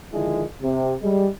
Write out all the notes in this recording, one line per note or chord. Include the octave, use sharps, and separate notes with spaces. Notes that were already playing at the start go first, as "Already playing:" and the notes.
D3 D#3 F3 G#3 D4 E4
C3
G3 G#3